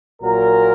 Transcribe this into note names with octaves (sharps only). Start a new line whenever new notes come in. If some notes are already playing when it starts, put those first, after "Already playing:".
A#1 A#2 F#3 A#4